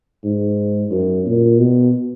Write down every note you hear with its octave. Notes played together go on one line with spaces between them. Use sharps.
G#2
F#2
A#2
B2